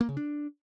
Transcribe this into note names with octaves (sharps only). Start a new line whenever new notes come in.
A#3
C#3
D4